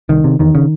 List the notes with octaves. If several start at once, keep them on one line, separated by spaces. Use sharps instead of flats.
C2 D#3
C3
E2 D#3
C#3